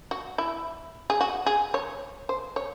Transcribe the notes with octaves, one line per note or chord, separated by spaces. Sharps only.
F#4
E4
G#4
F#4
G#4
C#5
C5
C#5